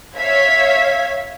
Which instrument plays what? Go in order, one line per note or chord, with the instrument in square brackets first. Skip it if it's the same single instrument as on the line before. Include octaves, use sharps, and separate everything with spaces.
[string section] C#5 E5 F5 G#6 B6